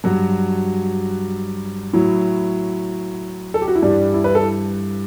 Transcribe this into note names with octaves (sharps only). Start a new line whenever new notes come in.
G2 F#3 F#4
A2 F#3 E4
A4
G4
F#4
E4
G2 E3 G3 D4
E4
B4
A4